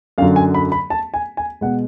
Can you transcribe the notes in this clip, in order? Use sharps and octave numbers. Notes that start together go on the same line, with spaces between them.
F#2 D3 F#3 F5
G#5
B5
B5
A5
G#5
G#5
B2 G#3 F#5